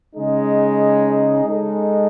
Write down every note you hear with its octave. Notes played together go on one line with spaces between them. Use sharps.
C#3 G#3 D#4 G#4
G#3 D#4 A4